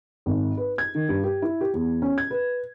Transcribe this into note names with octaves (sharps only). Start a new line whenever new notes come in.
G#1
B4
G#6
D#3
G2
G4
E4
G4
E2
C#4
G#6
B4